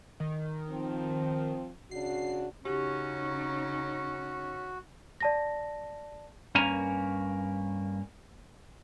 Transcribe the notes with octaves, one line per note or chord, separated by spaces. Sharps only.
D#3
F3 C4
C#3 D4 F#4 C7
C#3 C#4 D#4 F#4 G4
D5 A5 A#6
G2 A#3 C#4 A#4 G#5 A#5